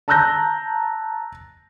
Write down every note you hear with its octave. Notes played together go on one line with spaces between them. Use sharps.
A5 A#5 E6 F#6 G6 A#6